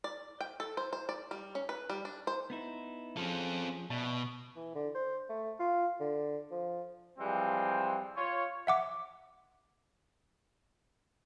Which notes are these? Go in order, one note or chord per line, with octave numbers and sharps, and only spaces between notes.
D5
G5
A4
C5
C5
D5
G3
C#4
B4
G3
D4
C5
B3 D#4 E4
F3 C4 C#4 G#4 A4
B2 D5 E5 A5
E3
D3
C5
A3
F4
D3
F3
E3 F3 G3 G#3 C4
F4 C#5
E5 F#5 D6